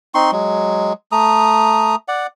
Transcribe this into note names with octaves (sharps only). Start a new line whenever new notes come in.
C4 D#4 C6 C#6
F#3 G#3
A3 A#5 D#6
D5 F#5